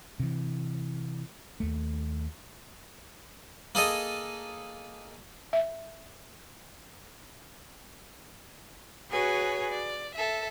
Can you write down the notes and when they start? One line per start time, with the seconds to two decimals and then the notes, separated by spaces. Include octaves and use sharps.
0.20 C3 E3
1.60 D#2 A3
3.75 A#3 G#4 A4 D#5
5.53 E5
9.11 F#4 G#4 B4 C#5 G#5
9.71 D5
10.14 A4 E5